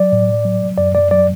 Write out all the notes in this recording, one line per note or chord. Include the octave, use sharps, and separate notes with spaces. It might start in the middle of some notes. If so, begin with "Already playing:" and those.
Already playing: F#3 D5
A2
F#3
F#2 D5
D5
F#3 D5